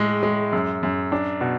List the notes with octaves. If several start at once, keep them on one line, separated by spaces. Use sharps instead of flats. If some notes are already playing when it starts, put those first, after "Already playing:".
Already playing: A2 G#3
G#3
F#2
F#2
D4
B2